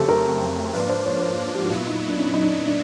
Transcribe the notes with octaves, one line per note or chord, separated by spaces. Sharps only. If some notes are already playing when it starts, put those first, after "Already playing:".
Already playing: F2 C#3 F#3 A3 C4 G4 A4
A#4
G#2 F3 A#3 D4 F4 B4
C5
C#5
C5
G4
F#4
A#2 F#3 B3 E4 F4
D#4
D4
C#4
D#4
D4
D4